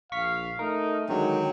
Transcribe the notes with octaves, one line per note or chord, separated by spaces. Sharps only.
A#1 F5 C#6 B6
A3 D#4 A#4
D3 D#3 F#3 G#3 G5